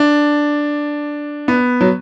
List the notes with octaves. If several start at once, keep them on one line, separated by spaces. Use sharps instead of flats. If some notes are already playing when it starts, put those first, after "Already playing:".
Already playing: D4
B3
F#3